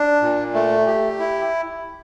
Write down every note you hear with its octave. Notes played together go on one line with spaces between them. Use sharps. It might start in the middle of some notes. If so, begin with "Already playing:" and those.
Already playing: D4
A#2
A3
G4
E4